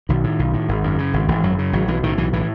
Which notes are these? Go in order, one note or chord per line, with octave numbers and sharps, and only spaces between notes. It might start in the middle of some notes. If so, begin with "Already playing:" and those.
B1 D#3
A2
B1
A2
G#1
F#2
C#3
G#1
G#1 E3
F#2 F#3
C#3
G#1 F#3
B1 E3
A2 D#3
B1 E3
A2 E3